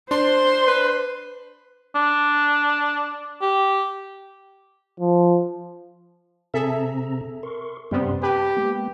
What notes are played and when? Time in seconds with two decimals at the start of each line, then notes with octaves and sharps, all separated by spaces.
0.11 D4 C5 C6
0.67 B4
1.95 D4
3.41 G4
5.00 F3
6.54 C3 C4 G#4 A4 E5 A#5
7.43 A#4 C6 C#6
7.91 F#2 C3 G3 B3 C#4 C6
8.23 G4 B4 A5
8.57 G#3 A#3 B3